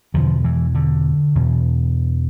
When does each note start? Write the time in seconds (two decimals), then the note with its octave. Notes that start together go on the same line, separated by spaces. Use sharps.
0.14 E2 B2 D3 F3
0.44 E3
0.75 D3
1.35 E2 B2